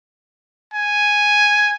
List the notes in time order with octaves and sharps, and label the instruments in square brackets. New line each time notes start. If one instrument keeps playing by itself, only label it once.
[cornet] G#5